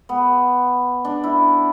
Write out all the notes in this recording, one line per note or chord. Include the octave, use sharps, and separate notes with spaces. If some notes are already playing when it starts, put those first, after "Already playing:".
B3
D4
E4